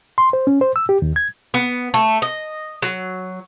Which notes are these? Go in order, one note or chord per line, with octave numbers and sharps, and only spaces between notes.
C6
C5
C#4
C5
E6
G4
D#2
G#6
B3
A3
D#5
F#3